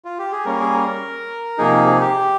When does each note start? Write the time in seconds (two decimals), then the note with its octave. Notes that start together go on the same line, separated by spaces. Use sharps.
0.05 F4
0.19 G4
0.32 G#4
0.45 G3 A#3 C#4 A#4
0.60 G#4
0.73 A#4
1.58 C3 F3 A#3 D#4 G#4
1.86 G#4
2.01 G4